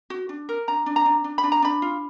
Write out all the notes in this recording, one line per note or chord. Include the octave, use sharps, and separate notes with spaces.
F#4
D4
A#4
D4 A#5
D4
A#5
D4
D4
B5
D4
A#5
D4 B5
F4